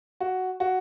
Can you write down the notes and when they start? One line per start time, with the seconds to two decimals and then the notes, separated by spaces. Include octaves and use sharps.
0.20 F#4
0.60 F#4